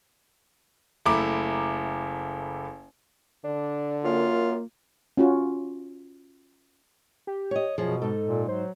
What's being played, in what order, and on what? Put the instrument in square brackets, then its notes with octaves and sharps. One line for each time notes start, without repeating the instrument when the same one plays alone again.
[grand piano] F#1 A3 E4 A#5 D6
[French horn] D3 [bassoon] D4
[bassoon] F#2 [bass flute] A#3 [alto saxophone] F4
[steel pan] C#4 F4 F#4
[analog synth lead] G4
[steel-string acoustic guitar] C#5 D#5
[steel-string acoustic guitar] F#2 F3 [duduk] B2 [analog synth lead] G#4
[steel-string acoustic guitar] G#2 D#4 [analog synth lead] A4
[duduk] A#2
[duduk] F#3 [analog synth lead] C5